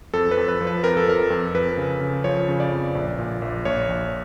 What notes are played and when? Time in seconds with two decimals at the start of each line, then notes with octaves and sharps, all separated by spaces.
0.14 F2 A4
0.31 B4
0.37 F2
0.48 B4
0.61 F3
0.67 B4
0.84 F2 A#4
0.97 A4
1.08 F2 A#4
1.30 F2
1.54 F2 B4
1.77 C#3
2.01 C#3
2.24 F3 C#5
2.48 C#3
2.60 D5
2.72 F2
2.95 A#1
3.19 A#2
3.42 A#1
3.65 A#1 C#5
3.88 A#1